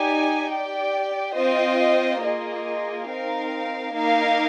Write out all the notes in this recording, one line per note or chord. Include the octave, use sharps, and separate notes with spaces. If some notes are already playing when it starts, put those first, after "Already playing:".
Already playing: D#4 G4 D5 G#5
G4 D5 G5
C4 F4 C5 D#5
A#3 F4 G#4 D#5
C4 D#4 A#4 F5
A#3 D#4 A#4 F5